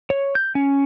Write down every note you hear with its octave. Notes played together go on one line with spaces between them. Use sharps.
C#5
G6
C#4